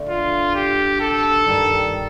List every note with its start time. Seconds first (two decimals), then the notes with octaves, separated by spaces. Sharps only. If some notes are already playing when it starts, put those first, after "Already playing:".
Already playing: D3 A3 D4
0.09 F4
0.55 G4
1.01 A4
1.46 G2 D#3 G3